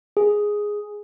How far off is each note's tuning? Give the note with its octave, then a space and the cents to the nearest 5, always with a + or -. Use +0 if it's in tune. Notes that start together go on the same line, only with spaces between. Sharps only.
G#4 +0